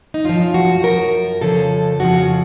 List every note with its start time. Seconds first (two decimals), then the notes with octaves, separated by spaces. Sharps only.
0.14 D#4
0.24 F#2 F3 F4
0.54 F#4
0.83 F#2 F3 A#4
1.41 F2 C#3 F3 A4
2.00 F2 C#3 F3 F#4